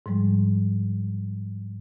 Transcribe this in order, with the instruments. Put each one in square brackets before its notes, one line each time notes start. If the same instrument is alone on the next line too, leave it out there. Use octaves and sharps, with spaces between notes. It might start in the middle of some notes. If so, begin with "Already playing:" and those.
[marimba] G#2 F3 G3 G#3